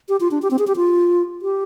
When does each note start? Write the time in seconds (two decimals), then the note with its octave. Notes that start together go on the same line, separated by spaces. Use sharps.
0.09 G4
0.20 F4
0.31 D4
0.42 G4
0.51 C4
0.59 G#4
0.67 G4
0.76 F4
1.42 G4